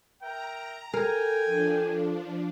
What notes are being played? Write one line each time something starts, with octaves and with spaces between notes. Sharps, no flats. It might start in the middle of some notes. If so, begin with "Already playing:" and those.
A#4 E5 G5 A#5
A4 A#4 G5 G#5
F3 D4